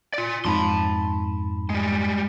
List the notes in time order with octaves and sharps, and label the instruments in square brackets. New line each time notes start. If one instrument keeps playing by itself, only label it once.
[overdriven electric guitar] F4 D5
[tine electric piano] F2 G#2 B5 [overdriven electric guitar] A5 C6
[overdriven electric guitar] G3 G#3